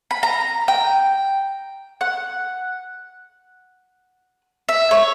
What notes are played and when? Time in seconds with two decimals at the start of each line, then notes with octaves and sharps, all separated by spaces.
0.11 B5
0.23 A#5
0.68 G5
2.01 F#5
4.69 E5
4.91 C#5